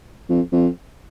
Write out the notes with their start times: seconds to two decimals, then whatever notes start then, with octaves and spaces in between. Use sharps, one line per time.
0.29 F2
0.52 F2